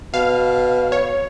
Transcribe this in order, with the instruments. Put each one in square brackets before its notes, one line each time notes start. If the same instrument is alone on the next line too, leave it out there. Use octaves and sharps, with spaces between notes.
[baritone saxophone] B2 [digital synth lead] F5
[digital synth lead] C#5